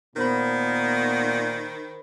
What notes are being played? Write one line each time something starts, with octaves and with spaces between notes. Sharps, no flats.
A#2 D#3 B3 A#4 C5 B5